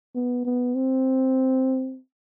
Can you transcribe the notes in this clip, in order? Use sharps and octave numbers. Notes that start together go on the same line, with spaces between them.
B3
B3
C4